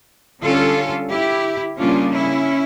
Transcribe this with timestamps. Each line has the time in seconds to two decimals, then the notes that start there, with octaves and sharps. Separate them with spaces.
0.42 D3 G3 C#4 F4 A4
1.11 E4 G4
1.79 C#3 G3 A#3 C#4 D4 F4
2.13 C#4 E4